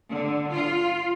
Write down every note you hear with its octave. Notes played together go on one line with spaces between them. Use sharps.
D3
F4